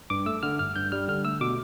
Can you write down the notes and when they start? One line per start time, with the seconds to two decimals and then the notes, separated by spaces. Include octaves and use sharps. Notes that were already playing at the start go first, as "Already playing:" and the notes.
0.10 G2 D6
0.26 A3 E6
0.43 D3 F6
0.59 G2 F6
0.76 G2 G6
0.92 G3 F6
1.08 D3 F6
1.25 A3 E6
1.41 B2 D6